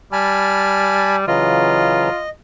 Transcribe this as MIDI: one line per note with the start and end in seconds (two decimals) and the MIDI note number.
0.12 1.23 55
0.12 1.16 80
0.12 1.16 81
0.12 1.16 83
0.12 1.02 89
1.27 2.10 49
1.27 2.10 52
1.27 2.10 54
1.27 2.21 65
1.27 2.29 75